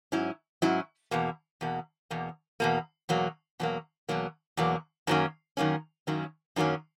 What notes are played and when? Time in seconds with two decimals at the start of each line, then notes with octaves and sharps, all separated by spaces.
0.12 G#2 F#3 C#4 E4
0.62 G#2 F#3 C#4 E4
1.11 E2 B2 A#3
1.61 E2 B2 A#3
2.10 E2 B2 A#3
2.60 E2 B2 A#3
3.09 E2 B2 F#3 A#3
3.59 E2 B2 F#3 A#3
4.09 E2 B2 F#3 A#3
4.57 E2 B2 F#3 A#3
5.07 F#2 D#3 F#3 A#3 C#4
5.57 F#2 D#3 F#3 A#3 C#4
6.07 F#2 D#3 F#3 A#3 C#4
6.56 F#2 D#3 F#3 A#3 C#4